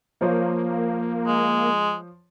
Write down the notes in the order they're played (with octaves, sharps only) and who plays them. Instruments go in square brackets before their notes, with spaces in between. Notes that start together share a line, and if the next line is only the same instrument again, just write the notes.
[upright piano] F3 C5 C#5 [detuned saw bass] A#3
[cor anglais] G#3